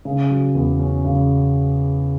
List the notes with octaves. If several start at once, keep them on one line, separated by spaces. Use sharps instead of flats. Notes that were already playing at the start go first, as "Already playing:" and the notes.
C#3
F#3
E2
C#4
C#3